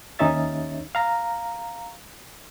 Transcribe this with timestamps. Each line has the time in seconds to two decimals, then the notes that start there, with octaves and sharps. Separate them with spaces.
0.19 D#2 C#4 D#4 C#5 E5 A6
0.95 F5 A#5